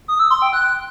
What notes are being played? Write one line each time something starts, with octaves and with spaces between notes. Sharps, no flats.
D#6
E6
C6
G5
F#6